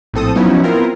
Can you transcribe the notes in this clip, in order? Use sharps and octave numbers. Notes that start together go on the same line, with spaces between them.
A#1 A2 C4 A4 D#6
F3 F#3 B3 C#4 D#4 E4
B3 C4 E4 F4 A#4